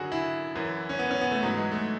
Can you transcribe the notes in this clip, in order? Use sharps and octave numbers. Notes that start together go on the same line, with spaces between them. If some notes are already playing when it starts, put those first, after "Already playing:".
Already playing: F#2 D3 F#4 G#4
E4
F#2 E3
C#4
B3
C#4
B3
A3
G#2 E3 F#3
G#3
A3